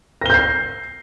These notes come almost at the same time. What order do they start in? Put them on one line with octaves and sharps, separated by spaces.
A#6 G7 G6 C7